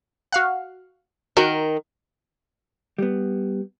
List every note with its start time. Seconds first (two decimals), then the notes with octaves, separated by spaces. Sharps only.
0.32 F#4 F5 F#5
1.37 D#3 F#4 A#4
2.98 G3 B3